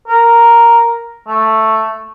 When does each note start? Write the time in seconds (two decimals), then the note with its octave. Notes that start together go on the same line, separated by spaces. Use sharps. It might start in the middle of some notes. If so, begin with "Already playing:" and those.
0.08 A#4
1.27 A3